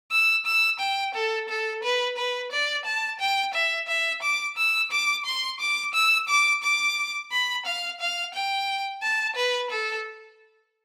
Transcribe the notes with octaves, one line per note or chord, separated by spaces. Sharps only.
E6
E6
G5
A4
A4
B4
B4
D5
A5
G5
E5
E5
D6
E6
D6
C6
D6
E6
D6
D6
B5
F5
F5
G5
A5
B4
A4